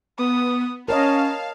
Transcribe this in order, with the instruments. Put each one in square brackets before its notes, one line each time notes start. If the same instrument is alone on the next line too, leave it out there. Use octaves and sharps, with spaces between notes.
[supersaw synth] B3 [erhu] D#6
[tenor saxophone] C#4 [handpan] A#4 C#5 D#5 [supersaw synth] F5 [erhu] A5